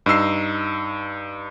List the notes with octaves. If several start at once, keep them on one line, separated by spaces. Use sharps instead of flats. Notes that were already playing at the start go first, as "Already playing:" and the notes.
G2 D#4 E6 C7